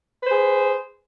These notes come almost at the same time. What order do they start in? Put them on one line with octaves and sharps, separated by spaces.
B4 C5 G#4